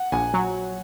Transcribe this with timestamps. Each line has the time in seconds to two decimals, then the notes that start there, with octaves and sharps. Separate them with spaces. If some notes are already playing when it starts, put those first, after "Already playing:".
Already playing: F#5
0.12 A#1 G#5
0.34 F#3